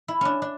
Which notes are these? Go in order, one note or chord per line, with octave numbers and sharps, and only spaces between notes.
E4
C#4 D4
D4